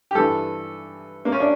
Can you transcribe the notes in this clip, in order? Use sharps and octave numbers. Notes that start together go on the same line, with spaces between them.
G4
G2 E3 A4
A#3
C#4
D4